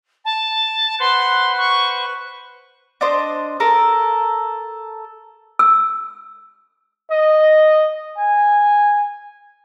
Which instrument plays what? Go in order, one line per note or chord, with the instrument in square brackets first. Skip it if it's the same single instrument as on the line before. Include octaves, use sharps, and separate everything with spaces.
[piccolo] A5
[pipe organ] B4 C5 F#5 [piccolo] C6
[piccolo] C#6
[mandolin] D4 C5 D#5
A4 A#4
[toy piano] E6
[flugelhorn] D#5
G#5